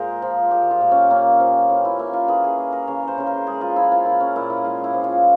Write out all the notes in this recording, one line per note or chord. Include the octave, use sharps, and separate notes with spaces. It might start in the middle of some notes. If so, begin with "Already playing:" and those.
Already playing: A#2 G#3 G#4 A#4 C5
F3
A#2 G4
F4
A#2
C#4
A#3 C#4
F3
E3 C#4
E4
A#3 E4
F4
E3 G#4
G#4
A#3
A#4
C#3 C#5
C5
C#3 C5
A#4
G#3 G#4
F4
F3 E4
F4
A#2 E4
C#4
A#2 E4
E4
G#3 F4
E4
F3
F4